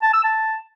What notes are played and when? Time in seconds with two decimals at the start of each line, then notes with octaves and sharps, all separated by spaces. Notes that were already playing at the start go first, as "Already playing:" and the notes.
0.02 A5
0.13 E6
0.24 A5